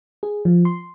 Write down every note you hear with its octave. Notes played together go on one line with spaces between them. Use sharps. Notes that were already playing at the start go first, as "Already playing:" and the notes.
G#4
F3
C6